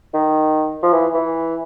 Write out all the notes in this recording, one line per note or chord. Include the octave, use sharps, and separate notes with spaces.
D#3
F3
E3
E3